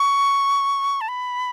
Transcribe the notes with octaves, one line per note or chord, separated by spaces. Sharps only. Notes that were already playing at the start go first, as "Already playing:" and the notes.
Already playing: C#6
A5
B5